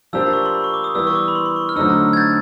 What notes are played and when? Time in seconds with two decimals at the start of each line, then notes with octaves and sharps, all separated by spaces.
0.13 F3 A#3 D4 G4 C5 E6
0.33 C#6
0.46 C6
0.54 B5
0.64 C#6
0.74 D6
0.84 D#6
0.95 E3 G3 B3 E6
1.07 C#6
1.15 D6
1.28 B5
1.35 C6
1.46 C6
1.56 C#6
1.69 F6
1.76 D3 F#3 A3 C4 D#4 E6
2.13 G#6
2.17 G6 A6